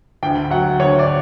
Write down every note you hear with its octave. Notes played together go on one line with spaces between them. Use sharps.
D2 G5
F#3 F#5
D2 C#5
D5